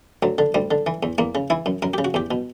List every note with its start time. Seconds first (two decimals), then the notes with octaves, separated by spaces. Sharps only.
0.23 D2 F#3
0.38 D3
0.54 D2 G3
0.71 D3
0.87 E3
1.03 E2
1.18 E2 A#3
1.35 C#3
1.50 E3 E4
1.66 F#2
1.82 F#2 A#4
1.94 C#3 G4
2.04 F#4
2.14 E2 G4
2.31 B2